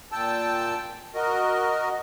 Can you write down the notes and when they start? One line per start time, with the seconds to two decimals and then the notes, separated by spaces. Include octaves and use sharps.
0.12 A#2 G5 A5 E6
1.15 F#4 A#4 D#5